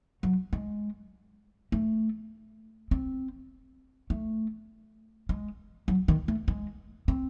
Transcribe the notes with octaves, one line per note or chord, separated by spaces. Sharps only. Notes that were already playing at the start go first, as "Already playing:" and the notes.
F#3
G#3
A3
C4
A3
G#3
F#3
D#3
A3
G#3
C4